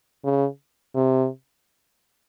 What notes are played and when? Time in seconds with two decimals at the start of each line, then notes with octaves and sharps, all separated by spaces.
0.24 C#3
0.95 C3